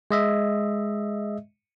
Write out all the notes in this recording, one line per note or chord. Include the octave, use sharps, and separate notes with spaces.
G#3 D#5 E5